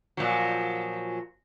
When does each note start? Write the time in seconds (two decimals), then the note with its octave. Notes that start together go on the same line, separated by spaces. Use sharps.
0.17 A#2 F3 F#3